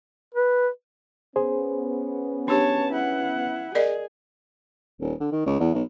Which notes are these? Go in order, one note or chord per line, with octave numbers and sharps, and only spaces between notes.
B4
B3 C#4 G#4 C5
D4 G4 C#5 A5
E4 F#5
G#4 A#4 D5 D#5
D#1
D3
D#3
C#2
E2
B1